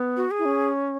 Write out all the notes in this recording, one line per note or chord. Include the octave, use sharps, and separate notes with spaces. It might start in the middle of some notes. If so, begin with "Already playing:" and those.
Already playing: B3
F#4
G#4
E4
C#4